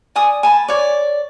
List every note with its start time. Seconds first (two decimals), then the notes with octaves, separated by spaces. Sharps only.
0.16 D5 G#5 D#6
0.43 G#5 A5 B5
0.68 C#5 D5